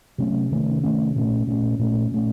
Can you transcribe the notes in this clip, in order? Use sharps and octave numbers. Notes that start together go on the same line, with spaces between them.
C3 F#3 A3 C#4
C3 D#3 A3 C#4
C3 D#3 A3 C#4
A#2 A3 C#4
A#2 A3 C#4
A#2 A3 C#4
A#2 A3 C#4